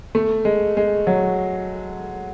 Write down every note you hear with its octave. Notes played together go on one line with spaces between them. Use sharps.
A3
G#3
G#3
F#3